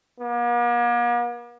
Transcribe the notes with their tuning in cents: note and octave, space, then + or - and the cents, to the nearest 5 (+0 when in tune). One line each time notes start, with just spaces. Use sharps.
A#3 +45